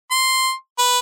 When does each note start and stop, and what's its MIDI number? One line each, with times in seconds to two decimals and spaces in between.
0.11 0.52 84
0.78 0.99 71